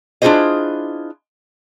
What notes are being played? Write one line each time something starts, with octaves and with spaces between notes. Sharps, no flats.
D4 E4 F4 G#4 C5 D#5